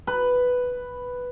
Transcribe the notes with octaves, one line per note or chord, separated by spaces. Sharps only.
B4